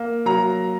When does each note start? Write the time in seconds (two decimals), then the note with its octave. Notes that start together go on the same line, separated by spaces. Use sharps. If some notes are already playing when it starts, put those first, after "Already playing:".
Already playing: A#3
0.26 F#3 A#5